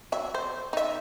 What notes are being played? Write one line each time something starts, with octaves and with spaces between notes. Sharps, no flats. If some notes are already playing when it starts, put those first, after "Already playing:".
F#3 E5
C5
D#4 E5